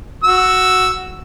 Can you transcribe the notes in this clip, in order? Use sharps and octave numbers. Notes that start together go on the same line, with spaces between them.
F#4 E6